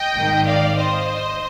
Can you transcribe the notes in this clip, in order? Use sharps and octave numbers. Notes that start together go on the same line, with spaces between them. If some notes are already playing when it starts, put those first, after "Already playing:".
Already playing: D#5 G5
G#1 G#2 D#3
D5 F5
C5 D#5